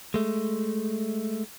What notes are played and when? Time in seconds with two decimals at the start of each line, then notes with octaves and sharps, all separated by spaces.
0.14 G#3 A3